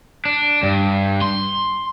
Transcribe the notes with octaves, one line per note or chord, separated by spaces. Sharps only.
D4
G2
C6